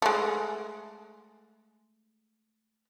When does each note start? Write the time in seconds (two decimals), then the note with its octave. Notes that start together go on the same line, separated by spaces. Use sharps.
0.02 G#3 A3